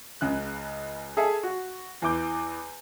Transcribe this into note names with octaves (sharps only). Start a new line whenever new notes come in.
C#2 C#3 F#6
G#4 A4 E5 G#5
F#4
E2 E3 E4 D6 G6